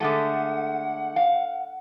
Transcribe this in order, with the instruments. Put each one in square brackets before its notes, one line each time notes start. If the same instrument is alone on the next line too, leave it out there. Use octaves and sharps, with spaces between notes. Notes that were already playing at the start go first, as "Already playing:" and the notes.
[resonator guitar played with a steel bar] D3 G#3 A3 [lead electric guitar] F#5
[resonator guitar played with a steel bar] F5